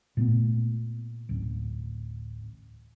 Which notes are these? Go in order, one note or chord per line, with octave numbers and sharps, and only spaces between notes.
A#2 A3 B3
D1 A1